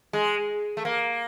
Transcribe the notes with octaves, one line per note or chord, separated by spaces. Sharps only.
G#3
A3
A#3